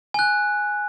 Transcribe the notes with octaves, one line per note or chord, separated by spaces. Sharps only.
G#5 F#6